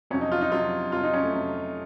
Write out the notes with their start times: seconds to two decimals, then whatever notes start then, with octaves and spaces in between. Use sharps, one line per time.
0.10 F2 C3 F#3 C#4
0.21 D#4
0.32 F4
0.41 D#4
0.51 F2 C3 F#3 F4
0.92 F2 C3 F#3 F4
1.03 D#4
1.13 C#4
1.23 A3
1.33 F2 C3 F#3